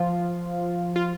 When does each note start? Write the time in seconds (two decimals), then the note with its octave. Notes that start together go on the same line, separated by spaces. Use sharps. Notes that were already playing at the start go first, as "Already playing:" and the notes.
Already playing: F3 F4
0.96 F4